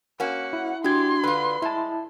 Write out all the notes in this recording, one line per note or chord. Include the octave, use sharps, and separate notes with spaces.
A#3 C#4 F#4 F#5
E4
D4 F#4 G4 C6 G#6
D3 F4 B4 B5
G#3 E4 A5